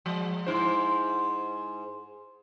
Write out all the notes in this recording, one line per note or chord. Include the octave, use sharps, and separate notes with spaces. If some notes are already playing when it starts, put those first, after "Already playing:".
F3 G#3
G#2 E4 C5